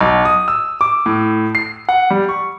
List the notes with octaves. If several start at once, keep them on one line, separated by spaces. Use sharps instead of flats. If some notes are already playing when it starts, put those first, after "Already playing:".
B1
D#6
E6
D6
A2
C7
F#5
G3
C#6